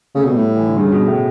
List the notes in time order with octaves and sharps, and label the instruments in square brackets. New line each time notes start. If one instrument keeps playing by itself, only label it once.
[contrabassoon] C#3 [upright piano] A3
[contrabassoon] B2
[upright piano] G3
[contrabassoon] A2
[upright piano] E3
D3
[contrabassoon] G2 [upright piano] C#3
[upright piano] B2
A2